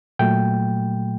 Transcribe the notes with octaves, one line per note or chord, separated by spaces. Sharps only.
A#2 F#3 A3 G5